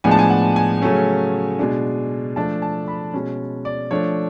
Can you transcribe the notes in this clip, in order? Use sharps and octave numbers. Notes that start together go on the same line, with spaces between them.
A2 F3 G#3 B3 D4 G#5
A5
G#5
F#5
G#5
C#3 F#3 A3 C#4
B2 G#3 D4
F3 A3 D4 A5
A5
B5
B2 G#3 C#4
D5
F3 A3 D4 C#5